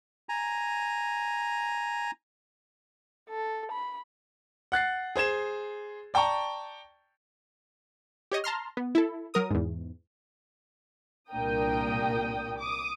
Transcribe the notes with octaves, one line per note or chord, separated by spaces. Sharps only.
G#5 A#5
A4
B5
F#5 F#6 A6 C7
G#4 C5 G#6 E7
D5 G5 A5 A#5 C#6
G4 C#5 D#5
A5 A#5 C6 F6
B3
E4 A4
F#3 A#4 D#6
E2 G#2
C2 A#2 D4 A#4 G5 D#6
D6 D#6